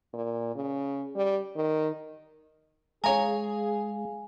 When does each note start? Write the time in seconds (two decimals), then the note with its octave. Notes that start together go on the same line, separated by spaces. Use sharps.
0.14 A#2
0.55 C#3
1.16 G3
1.56 D#3
3.04 G#3 G#4 C#5 F5 G#5 A#5